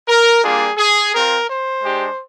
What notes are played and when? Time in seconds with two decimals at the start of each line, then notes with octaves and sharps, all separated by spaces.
0.08 A#4
0.43 G3 A#3 D4 F4 G#4
0.78 G#4
1.13 C4 F4 A#4
1.48 C5
1.82 G#3 D4 G4